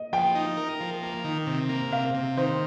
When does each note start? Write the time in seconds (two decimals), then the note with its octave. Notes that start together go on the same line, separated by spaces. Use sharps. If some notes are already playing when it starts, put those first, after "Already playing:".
Already playing: D#5
0.13 F3 G5
0.35 D#4
0.57 A#4
0.81 F3
1.03 A#3
1.25 D#3
1.47 C3
1.69 A#3
1.92 C3 F5
2.14 C3
2.37 D#3 C5